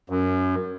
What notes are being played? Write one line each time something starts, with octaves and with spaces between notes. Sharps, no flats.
F#2